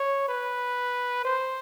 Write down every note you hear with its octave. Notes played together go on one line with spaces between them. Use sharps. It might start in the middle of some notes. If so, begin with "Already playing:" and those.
Already playing: C#5
B4
C5